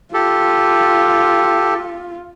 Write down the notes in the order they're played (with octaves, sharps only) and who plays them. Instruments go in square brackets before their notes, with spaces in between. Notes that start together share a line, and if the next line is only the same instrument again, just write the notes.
[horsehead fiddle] F4 [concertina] G4 A4